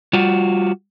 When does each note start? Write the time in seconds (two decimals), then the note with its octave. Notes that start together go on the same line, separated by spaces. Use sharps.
0.13 G3 F4 F#4